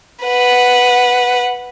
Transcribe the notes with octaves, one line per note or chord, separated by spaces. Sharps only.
B4 F#5